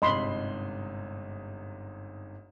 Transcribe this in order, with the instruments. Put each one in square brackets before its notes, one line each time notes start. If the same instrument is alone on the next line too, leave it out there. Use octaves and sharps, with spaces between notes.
[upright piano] G1 G#2 C3 [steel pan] D#5 B5 C6